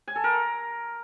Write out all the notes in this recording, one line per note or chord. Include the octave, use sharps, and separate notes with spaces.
G#5
A4
A#4